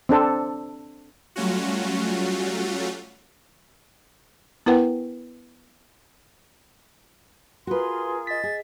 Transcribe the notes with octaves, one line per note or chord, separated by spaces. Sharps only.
C4 D4 A4 C5
F#3 G3 A3 C#4 F4 F#4
B3 E4 A#4 B4 F#5 G5
F4 F#4 G#4 A#4 B4 C6
D#5 A6 B6
G#4